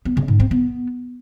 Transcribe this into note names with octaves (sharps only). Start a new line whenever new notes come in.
B3
C#3
G#2
C4
B3